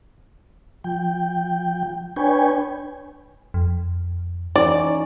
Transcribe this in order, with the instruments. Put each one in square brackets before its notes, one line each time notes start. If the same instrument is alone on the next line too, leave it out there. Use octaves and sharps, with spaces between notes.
[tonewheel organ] F3 G5
D4 B4 C#5 G5 G#5
[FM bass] F2
[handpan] E3 C#4 D#4 [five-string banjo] D5